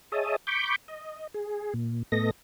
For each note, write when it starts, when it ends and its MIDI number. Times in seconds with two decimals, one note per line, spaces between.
0.12 0.36 68
0.12 0.36 73
0.12 0.36 75
0.12 0.36 76
0.12 0.36 81
0.12 0.36 87
0.47 0.76 83
0.47 0.76 85
0.47 0.76 86
0.47 0.76 91
0.88 1.27 75
1.34 1.74 68
1.74 2.03 46
2.12 2.31 45
2.12 2.31 57
2.12 2.31 59
2.12 2.31 69
2.12 2.31 75
2.12 2.31 94